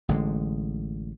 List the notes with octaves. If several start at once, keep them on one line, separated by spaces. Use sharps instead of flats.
A1 D3 D#3 G#3